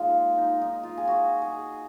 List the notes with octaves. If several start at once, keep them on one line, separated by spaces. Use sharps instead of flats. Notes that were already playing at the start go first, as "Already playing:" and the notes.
Already playing: A#2 F3 G#3 D#4 F4 G#4
D#4
D#4
F4
G#4
F#4
G#4